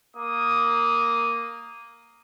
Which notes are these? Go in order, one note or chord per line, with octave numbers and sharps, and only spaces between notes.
A#3 D#6